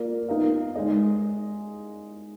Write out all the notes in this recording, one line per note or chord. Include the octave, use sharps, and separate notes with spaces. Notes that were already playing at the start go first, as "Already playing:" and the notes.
Already playing: A#3 F4 A#4 D5
B3 D#4 A#4 F5
G#3 D#4 G#4 D#5